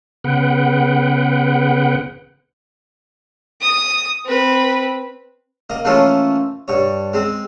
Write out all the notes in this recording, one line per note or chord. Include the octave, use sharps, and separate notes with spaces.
C#3 B3 B4 F#5 G5
D#6
C4 B4
A#3 D#5
E3 F3 A3 A#3 C#4 F4
G2 C#5
G#3 C4